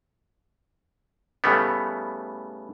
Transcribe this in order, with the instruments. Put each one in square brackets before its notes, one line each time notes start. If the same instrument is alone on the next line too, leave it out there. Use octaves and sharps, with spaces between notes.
[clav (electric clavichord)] A2 C#3 G3 A3 B3